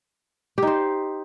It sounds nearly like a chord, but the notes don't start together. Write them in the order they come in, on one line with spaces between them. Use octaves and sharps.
G4 D#4 C5